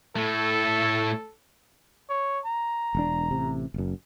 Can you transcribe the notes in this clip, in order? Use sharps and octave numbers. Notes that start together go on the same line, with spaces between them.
A2 A3 A4
C#5
A#5
E1 D4
A1 C3
F#1 F#2